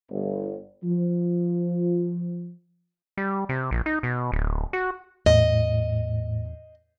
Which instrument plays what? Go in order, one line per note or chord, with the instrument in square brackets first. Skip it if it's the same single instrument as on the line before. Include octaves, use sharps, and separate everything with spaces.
[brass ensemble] G1
F3
[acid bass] G3
C3
A#1
D#4
B2
D1
F#4
[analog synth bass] E2 [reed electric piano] A2 [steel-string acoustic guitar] D#5